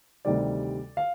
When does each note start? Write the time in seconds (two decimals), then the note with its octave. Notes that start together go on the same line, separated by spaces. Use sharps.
0.25 D2 C3 D#3 G3 D5
0.97 F5